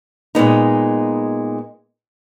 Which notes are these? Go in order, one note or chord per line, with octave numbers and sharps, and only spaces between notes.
A#2 G#3 B3 D#4